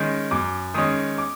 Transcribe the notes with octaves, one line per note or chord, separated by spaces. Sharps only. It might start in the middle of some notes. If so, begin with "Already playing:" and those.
Already playing: D#3 G#3 C#4
F#2 D6
D#3 G#3 C#4 D#6
D6